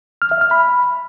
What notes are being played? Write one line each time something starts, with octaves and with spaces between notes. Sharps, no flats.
F6
E5
F6
B5